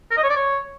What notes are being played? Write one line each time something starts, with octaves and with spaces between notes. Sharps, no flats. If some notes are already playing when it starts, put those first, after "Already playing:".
A#4
D#5
C#5
D5
C#5